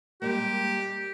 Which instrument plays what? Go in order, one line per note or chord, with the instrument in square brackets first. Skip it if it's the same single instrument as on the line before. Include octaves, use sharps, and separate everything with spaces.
[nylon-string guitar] G3 G#3 A#3 [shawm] G4